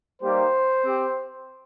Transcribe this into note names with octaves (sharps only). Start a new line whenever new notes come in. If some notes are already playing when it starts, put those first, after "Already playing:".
G3 A#3 D#4 G4 C5
C4 G4